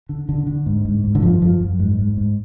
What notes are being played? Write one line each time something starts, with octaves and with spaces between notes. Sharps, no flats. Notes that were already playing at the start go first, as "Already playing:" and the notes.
D3
D3
D3
G#2
G#2
G#2
D3
F#2 F3
F#2 F3
F#2
G#2
G#2
G#2